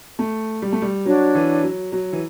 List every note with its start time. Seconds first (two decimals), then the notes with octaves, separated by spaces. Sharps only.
0.19 A3
0.62 G3
0.72 A3
0.82 G3
1.05 F#3 D4 F#4 C#5
1.35 E3
1.63 F#3
1.92 F#3
2.13 E3